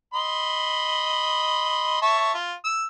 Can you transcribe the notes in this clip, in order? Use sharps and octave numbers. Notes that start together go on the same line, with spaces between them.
D#5 B5 C6
C#5 E5 A5
F4
E6